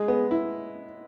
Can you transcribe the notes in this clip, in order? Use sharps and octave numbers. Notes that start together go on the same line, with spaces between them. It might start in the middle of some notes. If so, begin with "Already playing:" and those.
Already playing: G#3 G#4
B3
E4